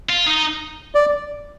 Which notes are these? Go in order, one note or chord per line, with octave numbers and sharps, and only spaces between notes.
F4
D#4
D5